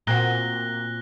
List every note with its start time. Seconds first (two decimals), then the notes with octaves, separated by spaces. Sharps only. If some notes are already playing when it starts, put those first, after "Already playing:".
0.07 A#2 C4 F#4 F#6 A#6 G7